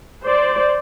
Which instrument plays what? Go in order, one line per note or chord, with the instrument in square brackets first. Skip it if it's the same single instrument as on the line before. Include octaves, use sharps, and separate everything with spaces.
[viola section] C5 D5